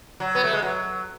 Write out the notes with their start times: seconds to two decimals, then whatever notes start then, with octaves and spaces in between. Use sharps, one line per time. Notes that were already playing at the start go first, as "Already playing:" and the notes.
0.20 F#3
0.35 B3
0.44 A3
0.53 G#3
0.63 F#3